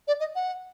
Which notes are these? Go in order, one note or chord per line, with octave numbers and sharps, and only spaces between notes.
D5
D#5
F#5